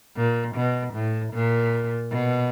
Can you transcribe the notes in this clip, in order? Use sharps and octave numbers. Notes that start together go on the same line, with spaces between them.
A#2
B2
A2
A#2
B2